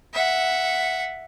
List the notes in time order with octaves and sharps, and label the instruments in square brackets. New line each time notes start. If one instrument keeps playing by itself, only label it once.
[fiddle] E5 F#5